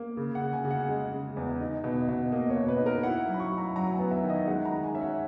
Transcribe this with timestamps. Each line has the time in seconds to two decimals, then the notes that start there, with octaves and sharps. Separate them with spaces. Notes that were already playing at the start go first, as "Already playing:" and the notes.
Already playing: A#3
0.17 C#3
0.35 F#5
0.42 C#3
0.53 G#5
0.65 C#3
0.71 F#5
0.89 G#3
1.12 C#3
1.37 E2
1.61 D#4
1.84 B2
2.09 B2
2.32 A#3 D#5
2.50 C#5
2.56 B2
2.68 B4
2.80 D#4
2.86 A#4
3.03 E4 F#5
3.28 F#3
3.34 B5
3.40 C#6
3.52 E4
3.58 A#5
3.76 F#3 A#5
3.94 G#5
3.99 B3
4.11 E5
4.23 D#3
4.29 D#5
4.47 G#3 F#5
4.65 A#5
4.72 D#3
4.84 G#5
4.95 C#4 E5
5.01 F#5